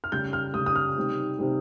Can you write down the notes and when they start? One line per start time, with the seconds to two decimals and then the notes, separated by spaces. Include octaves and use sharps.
0.04 F6
0.12 C#3 G3 G6
0.33 F6
0.54 C#3 G3 D#6
0.66 D#6
0.76 F6
0.96 C3 D#3 G3
1.39 C3 D#3 G3